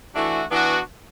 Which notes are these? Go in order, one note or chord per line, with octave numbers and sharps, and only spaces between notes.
E3 A3 D4 F#4
E3 B3 D4 F#4